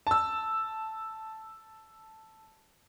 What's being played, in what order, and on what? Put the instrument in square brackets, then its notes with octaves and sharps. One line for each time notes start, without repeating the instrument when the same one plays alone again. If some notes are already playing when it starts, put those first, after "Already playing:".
[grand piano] A5 E6